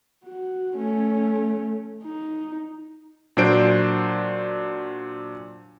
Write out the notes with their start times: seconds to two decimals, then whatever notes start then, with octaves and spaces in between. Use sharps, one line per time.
0.25 F#4
0.77 A3 C#4
2.03 D#4
3.37 A#2 F#3 D4 C5 D7